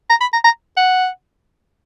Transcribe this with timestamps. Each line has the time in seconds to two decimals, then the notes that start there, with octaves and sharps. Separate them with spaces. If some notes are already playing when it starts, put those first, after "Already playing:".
0.10 A#5
0.21 B5
0.33 A#5
0.44 A#5
0.77 F#5